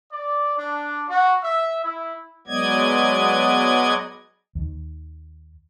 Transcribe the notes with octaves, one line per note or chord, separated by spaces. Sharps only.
D5
D4
F#4
E5
E4
F#3 G#3 B3 D5 D#5 G#6
D#2 D#3